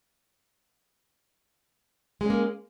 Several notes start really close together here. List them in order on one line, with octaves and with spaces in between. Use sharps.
G#3 C#4 A#3